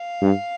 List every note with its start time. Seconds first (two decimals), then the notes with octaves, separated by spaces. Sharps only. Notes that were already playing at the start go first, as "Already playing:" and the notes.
Already playing: F5
0.22 G2